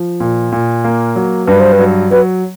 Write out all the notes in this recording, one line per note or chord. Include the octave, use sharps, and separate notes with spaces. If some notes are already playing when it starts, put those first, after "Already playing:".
Already playing: F3
A#2
A#2
A#3
F#3
G2 B4
C5
B4
F#3
F#3 B4